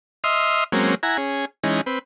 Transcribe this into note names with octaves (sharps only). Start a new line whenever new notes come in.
D#5 E5 C6 D#6 F6
F#3 G#3 A#3 C4 C#4
E4 F#5 G#5 A#5
C#4 G#4
E3 G#3 C#4 D#4
C4 B4